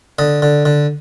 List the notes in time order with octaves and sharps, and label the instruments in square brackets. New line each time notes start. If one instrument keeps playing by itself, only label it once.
[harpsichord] D3 D#5
D3
D3